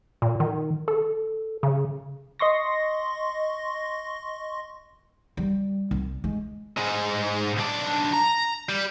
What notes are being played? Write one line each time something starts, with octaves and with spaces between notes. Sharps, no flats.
A#2
D#3
A4
C#3
D#5 C6 C#6 A#6
G3
C2
G#3
G#2 G#3
B1 D4
A#5
G3